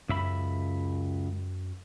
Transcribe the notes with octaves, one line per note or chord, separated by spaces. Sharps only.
C#2 F#2 E5 B5